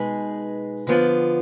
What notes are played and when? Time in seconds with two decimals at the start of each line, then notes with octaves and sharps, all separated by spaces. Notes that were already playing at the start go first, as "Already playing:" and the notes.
Already playing: B2 G#3 D#4 G#4 B4
0.87 D3 F3 B3 F4